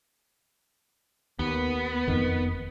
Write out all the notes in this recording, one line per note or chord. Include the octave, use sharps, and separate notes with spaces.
D#2 B3
F#1 F2 D#3